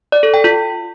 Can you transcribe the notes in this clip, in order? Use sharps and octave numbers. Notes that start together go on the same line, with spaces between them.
D5
A4
G5
F4